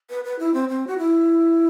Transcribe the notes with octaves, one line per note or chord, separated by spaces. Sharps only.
B4
B4
E4
C4
C4
F#4
E4